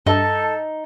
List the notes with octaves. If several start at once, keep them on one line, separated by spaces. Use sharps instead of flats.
G2 D#4 A4